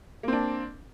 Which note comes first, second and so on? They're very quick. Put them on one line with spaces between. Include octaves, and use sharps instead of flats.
A#3 C4 D4